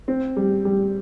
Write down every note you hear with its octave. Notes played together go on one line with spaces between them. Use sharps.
C4
G3
G3